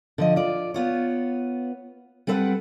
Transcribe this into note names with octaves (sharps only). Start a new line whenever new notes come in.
D3 F3 D#5
F4 D5
B3 F4 C#5
G3 C4 A4 B4 D#5 F#5